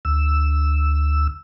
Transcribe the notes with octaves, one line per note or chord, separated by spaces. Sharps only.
D2 E6